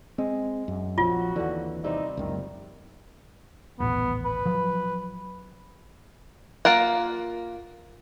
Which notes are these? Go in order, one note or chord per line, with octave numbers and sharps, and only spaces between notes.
G#3 C4
F#2
A#1 F3 F#3 C4 F4 F#4
D#2 D3 E3
C3 G3 C4 D#4
F#1 C#2 D#3
D#1 A1 B3
B4
F3 F#3
A#3 F4 A#4 F#5